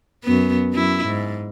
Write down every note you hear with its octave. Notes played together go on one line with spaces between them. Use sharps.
F#2 B3
F#2 E4
G#2